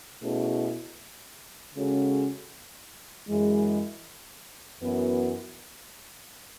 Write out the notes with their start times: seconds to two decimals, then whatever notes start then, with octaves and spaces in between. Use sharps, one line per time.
0.21 B2 A3 C#4 E4 G#4
1.73 C#3 G#3 C#4 F#4 A4
3.27 F#2 E3 G#3
4.79 F#2 E3 B3 F#4 B4